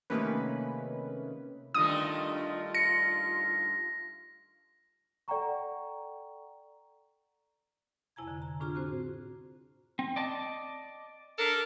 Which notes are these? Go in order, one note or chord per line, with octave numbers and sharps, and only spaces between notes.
C3 D#3 A3 A#3 C#4 B4
G2 D#3 A3 F4 D#6
A#6 C#7
A4 D5 F#5 G5 A#5 C#6
F2 C3 E4 G#5 A#5 G#6
D3
A#5
A2 D4 F4 G#4 A#5 F6
C4 F#4 C5
C4
D5 D#5 A5
D4 A4 A#4